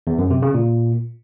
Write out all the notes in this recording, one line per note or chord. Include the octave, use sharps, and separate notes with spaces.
E2
F#2
C3
C#3
A#2